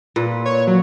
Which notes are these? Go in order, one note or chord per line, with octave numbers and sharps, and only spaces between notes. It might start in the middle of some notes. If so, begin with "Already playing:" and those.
A#2 B4
C#5
F#3